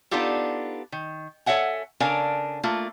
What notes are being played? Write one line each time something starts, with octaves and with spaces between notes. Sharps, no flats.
B3 D4 D#4 F4 G4 A4
D#3
A4 C#5 E5 F#5 G#5
C#3 D4 A4 A#4 F5 G#5
A3 A#3 F4